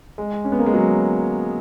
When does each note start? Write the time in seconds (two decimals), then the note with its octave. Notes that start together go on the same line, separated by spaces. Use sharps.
0.18 G#3
0.44 C#4
0.52 B3
0.59 A#3
0.66 G#3
0.74 F#3